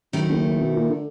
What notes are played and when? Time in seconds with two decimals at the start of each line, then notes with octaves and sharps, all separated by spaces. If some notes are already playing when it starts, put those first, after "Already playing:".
0.13 F#2 D#3 A3 E4
0.29 F#1
0.61 B2
0.77 A#2
0.90 D3